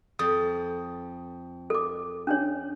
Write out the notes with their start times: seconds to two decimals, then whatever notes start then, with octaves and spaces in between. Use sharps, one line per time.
0.19 F2 D#6
1.70 A4 D6
2.27 C#4 D4 C#5